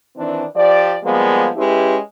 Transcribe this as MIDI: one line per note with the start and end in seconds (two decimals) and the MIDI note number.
0.17 0.44 51
0.17 0.44 52
0.17 0.44 60
0.17 0.44 62
0.55 0.95 53
0.55 0.95 67
0.55 0.95 74
1.04 1.48 53
1.04 1.48 55
1.04 1.48 56
1.04 1.48 58
1.04 1.48 59
1.56 1.97 56
1.56 1.97 61
1.56 1.97 64
1.56 1.97 67
1.56 1.97 71